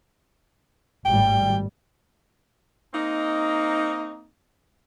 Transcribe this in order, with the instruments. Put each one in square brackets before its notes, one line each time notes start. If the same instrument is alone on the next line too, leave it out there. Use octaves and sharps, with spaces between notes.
[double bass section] G#1 A2 G3 [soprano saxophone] G5
[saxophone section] A#3 C4 D#4